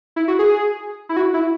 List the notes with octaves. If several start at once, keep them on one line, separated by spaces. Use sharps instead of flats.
E4
F#4
G#4
E4
F#4
E4